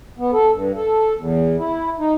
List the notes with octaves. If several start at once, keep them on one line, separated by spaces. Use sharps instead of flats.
B3
A4
G2
A4
E2
E4
D#4